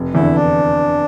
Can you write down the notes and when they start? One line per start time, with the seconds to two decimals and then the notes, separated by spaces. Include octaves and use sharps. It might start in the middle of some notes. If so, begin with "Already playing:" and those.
Already playing: F1
0.14 E2 D3 E4
0.36 D4